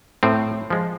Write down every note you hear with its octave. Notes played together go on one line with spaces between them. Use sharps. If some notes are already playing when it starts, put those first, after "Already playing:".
A2 C4
F3 G#3